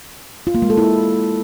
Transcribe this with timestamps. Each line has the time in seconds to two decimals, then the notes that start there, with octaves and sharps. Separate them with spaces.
0.47 F4
0.55 A#3
0.62 G#3
0.70 A4
0.78 E4